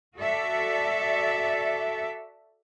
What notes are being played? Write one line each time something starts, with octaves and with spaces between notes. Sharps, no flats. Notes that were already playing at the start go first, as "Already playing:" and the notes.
F#4 A4 D5 E5